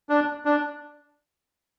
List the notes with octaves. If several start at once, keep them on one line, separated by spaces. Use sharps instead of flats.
D4
D4